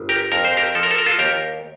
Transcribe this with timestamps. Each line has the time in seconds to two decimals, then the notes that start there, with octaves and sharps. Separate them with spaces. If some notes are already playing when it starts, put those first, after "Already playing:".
Already playing: G1
0.09 G4 A#4
0.32 F2 A#4
0.45 C5
0.57 G4 A#4
0.75 F3 A4
0.83 A#4
0.91 A4
0.98 A#4
1.06 F4 A4
1.19 D#2 G4 A#4